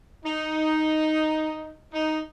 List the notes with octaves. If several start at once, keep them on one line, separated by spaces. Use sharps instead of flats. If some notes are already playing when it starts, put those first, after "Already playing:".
D#4
D#4